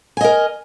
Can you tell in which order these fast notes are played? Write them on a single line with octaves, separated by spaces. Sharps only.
G#5 D#5 A#4